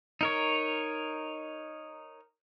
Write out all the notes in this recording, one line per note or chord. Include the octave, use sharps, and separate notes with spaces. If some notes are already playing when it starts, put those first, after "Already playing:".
D#4 A#4 C#5